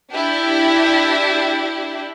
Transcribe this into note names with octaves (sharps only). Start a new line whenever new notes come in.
D4 E4 G4